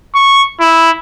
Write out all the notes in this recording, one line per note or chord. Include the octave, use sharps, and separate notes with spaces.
C#6
E4